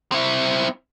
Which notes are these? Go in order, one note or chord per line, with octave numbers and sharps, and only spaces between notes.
C4 E4